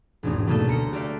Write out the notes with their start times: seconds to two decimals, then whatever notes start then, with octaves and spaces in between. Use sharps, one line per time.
0.23 E1 A1 G#2 D4 D#4
0.47 B2 F#3 A3 A#3 D#4 A4
0.68 D2 A4 A#5 C#7
0.92 F#4 G4 A4 D5 E5 F5